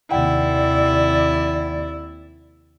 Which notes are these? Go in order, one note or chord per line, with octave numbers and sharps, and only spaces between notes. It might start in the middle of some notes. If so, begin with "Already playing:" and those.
D#2 C3 E4 D5 F#5 G5